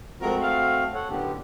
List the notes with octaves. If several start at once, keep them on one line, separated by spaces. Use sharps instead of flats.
F3 G#3 A3 C4 F#4 A#4
F5
A4 C#5 F#5
F#2 A2 D3 B3 G4